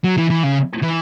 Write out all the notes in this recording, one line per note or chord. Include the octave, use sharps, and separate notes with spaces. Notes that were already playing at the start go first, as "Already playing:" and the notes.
F#3
E3
E3
C#3
E3